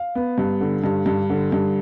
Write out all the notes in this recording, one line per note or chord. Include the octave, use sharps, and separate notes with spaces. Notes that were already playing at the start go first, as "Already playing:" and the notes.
Already playing: F5
B3
G2
D3
G2
G2
D3
G2